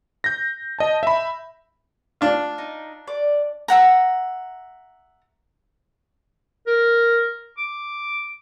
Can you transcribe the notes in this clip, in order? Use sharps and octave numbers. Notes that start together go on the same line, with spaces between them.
G6 A#6
D#5 A5
E5 B5
D4 F4
D#4
D5
E5 F#5 A#5
A#4
D6